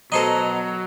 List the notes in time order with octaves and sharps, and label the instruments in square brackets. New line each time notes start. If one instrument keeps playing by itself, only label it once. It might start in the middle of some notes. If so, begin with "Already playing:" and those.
[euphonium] B2 [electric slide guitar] F#3 [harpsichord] A4 C5 D#5 [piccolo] A#5